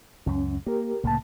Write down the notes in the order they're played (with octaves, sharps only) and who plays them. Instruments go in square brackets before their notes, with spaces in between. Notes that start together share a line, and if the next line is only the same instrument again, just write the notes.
[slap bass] C#2 F#2 [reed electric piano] C#4
[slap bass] A#3 [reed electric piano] G4 A#4
[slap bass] C2 A2 C#3 [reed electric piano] A#3 A5